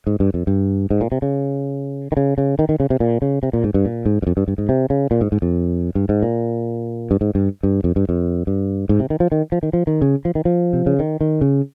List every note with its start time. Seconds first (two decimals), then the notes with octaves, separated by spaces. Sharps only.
0.07 G#2
0.20 G2
0.34 F2
0.47 G2
0.90 G#2
1.01 A#2
1.12 C3
1.22 C#3
2.12 D#3
2.17 C#3
2.38 C#3
2.59 D#3
2.69 D#3
2.80 C#3
2.90 C3
3.00 A#2
3.22 C#3
3.43 C3
3.53 A#2
3.64 G#2
3.74 G2
3.85 A#2
4.06 G#2
4.22 G2
4.27 F2
4.37 G2
4.48 G2
4.58 G#2
4.69 C3
4.90 C#3
5.11 A#2
5.21 G#2
5.32 G#2
5.42 F2
5.95 G2
6.09 G#2
6.23 A#2
7.11 G2
7.21 G#2
7.35 G2
7.63 G2
7.84 F2
7.96 G2
8.09 F2
8.47 G2
8.89 G#2
9.00 C3
9.10 D#3
9.20 F3
9.32 D#3
9.52 F3
9.63 D#3
9.73 F3
9.87 D#3
10.02 C#3
10.25 F3
10.35 D#3
10.45 F3
10.73 C3
10.86 C#3
10.99 D#3
11.21 D#3
11.41 C#3